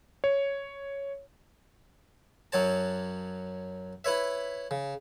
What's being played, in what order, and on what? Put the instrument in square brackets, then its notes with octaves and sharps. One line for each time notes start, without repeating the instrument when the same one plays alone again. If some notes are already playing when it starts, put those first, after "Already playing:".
[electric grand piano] C#5
[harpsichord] F#2 F#3 C#5 A5
E4 B4 C#5 E5
C#3